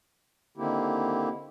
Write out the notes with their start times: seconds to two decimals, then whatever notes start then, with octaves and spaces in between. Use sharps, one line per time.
0.57 D3 D#3 A#3 C4 E4 G4